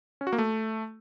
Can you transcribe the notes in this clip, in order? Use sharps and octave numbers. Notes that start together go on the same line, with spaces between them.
C#4
F#4
A#3
A3